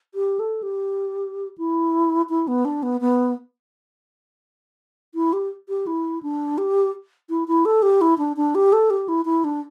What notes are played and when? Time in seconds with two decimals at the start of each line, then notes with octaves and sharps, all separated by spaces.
0.15 G4
0.39 A4
0.63 G4
1.58 E4
2.29 E4
2.48 B3
2.65 D4
2.83 B3
3.01 B3
5.15 E4
5.33 G4
5.69 G4
5.87 E4
6.23 D4
6.58 G4
7.30 E4
7.48 E4
7.65 A4
7.82 G4
8.01 E4
8.18 D4
8.37 D4
8.55 G4
8.73 A4
8.90 G4
9.08 E4
9.25 E4
9.44 D4